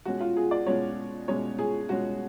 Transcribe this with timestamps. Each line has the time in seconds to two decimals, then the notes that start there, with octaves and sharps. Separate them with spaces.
0.05 B2 G#3 C#4 F#4
0.21 F4
0.37 G#4
0.51 D5
0.66 B2 G#3 C#4 C#5
1.28 B2 G#3 C#4 C#5
1.59 G#4
1.89 B2 G#3 C#4 F#4